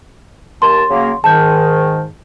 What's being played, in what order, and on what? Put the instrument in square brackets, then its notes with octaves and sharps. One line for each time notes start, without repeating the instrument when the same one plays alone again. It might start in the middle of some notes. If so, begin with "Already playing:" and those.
[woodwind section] D#2 A5 [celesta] C6
[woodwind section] C#3 F#3 A#3
[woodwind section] G#2 D#3 [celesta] A5 G6